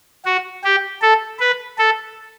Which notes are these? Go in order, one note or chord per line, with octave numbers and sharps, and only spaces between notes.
F#4
G4
A4
B4
A4